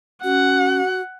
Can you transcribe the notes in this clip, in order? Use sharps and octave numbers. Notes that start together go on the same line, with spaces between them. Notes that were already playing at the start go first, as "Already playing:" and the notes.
C#4 F#4 F#5